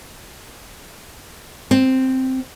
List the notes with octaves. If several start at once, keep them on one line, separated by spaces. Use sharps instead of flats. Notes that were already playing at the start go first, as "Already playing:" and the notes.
C4